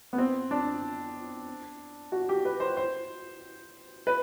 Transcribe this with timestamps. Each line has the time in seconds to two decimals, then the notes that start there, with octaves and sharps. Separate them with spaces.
0.13 B3
0.18 C4
0.51 D4
2.12 F#4
2.29 G4
2.45 B4
2.60 C5
2.77 C5
4.07 B4